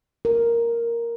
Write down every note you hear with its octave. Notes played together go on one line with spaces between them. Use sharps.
A#4